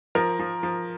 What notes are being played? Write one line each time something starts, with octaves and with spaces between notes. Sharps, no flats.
F3 A#4
F3
F3